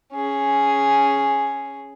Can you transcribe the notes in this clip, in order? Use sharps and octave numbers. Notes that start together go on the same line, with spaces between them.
C#4 G#4